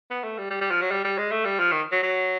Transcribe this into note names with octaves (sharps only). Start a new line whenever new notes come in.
B3
A3
G3
G3
G3
F3
F#3
G3
G3
G#3
A3
G3
F3
D#3
F#3
F#3